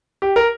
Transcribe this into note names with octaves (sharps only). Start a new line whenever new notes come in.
G4
A#4